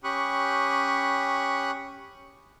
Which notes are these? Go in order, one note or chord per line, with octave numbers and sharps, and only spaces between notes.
C#4 G4 B5 C#6 D#6 F#6